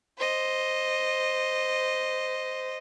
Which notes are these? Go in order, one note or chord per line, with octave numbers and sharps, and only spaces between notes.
C5 D#5